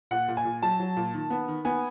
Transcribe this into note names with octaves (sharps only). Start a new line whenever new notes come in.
A#2 F#5
A#2
G#5
A#2
F#3 A5
F#3
A#2
D#3
B3
D#3
B3 G#5